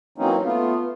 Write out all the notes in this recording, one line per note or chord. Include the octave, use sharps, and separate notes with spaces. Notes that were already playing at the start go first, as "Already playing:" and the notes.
E3 F#3 A#3 C4 C#4 D#4
A3 B3 F4